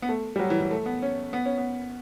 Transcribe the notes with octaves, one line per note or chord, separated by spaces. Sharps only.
B3
A3
G3
F#3
E3
E3
A3
B3
C#4
B3
C#4
B3